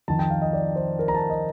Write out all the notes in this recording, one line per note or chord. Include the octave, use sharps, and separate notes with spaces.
F2 D#3 A5
G5
F5
D#5
D5
C5
A#4
A#5
A5
D#5